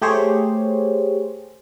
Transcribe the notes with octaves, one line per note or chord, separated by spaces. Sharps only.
A3 G4 G#4 C5 C#5